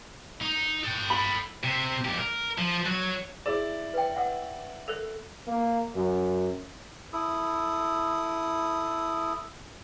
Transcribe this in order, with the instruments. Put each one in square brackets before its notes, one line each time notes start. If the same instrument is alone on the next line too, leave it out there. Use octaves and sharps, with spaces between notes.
[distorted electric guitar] D#4
A4 G5
[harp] B5
[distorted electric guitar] C3
F2 G4
A#4
F3
F#3 C#5
[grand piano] E4 D5 [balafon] G#4
[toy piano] B4 G5
E5 F#5 E6
[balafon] A4 A#4 [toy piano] E5
[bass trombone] A#3
F#2
[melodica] E4 A4 D#6